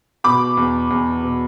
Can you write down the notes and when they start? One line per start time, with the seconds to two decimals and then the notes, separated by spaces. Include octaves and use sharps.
0.24 B2 B5 D6
0.57 E2
0.90 E2
1.23 B2